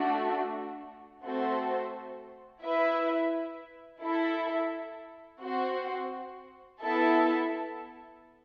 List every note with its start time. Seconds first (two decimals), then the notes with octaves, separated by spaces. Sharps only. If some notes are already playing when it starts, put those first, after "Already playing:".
Already playing: A3 D4 F#4
1.24 A3 C4 F#4 A4 C5
2.63 E4 B4 E5
4.03 E4 A4 E5
5.42 C4 F#4 C5
6.81 B3 E4 A4 E5 A5